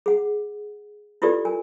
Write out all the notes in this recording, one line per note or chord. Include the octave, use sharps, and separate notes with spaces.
G#4 F#5
E4 F4 G4 A4 B4 D5
A#4 G#5